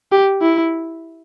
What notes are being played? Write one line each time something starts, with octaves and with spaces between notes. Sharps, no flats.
G4
E4